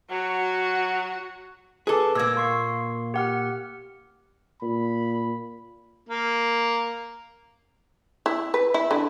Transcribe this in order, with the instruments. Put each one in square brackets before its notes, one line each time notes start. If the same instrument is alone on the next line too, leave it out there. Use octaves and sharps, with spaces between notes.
[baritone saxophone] F#3 [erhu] F#4
[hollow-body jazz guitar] G#4 A4 [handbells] B4 D6
[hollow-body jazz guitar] A#2 A#3 [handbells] E6 G#6
[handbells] C6 C#6 C7
G4 F#5 F6
[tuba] A#2 [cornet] B5
[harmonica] A#3
[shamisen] E4
B4
E4
D3